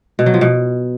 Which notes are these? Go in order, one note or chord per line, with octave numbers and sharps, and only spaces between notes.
B2
F#3
F3
B2